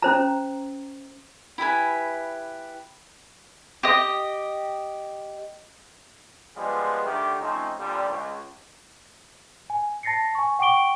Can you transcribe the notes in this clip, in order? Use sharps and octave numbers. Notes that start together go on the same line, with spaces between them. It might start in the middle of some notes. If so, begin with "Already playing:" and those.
C#4 C5 A#5
E4 G4 B4 G#5
G4 D#5
F3 G3 G#3 B3 F4 G#4
D3 D#3 A3 G4
F3 A3 C4 C#4 D#4
A#2 D3 F3 G3
C#2
G#5
A5 A6 A#6 C7 C#7
G#5 C#6
F#5 G5 C#6 D6 D7 G7